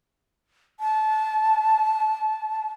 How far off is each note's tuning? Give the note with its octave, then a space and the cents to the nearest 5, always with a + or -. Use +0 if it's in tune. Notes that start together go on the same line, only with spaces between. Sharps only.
A5 -25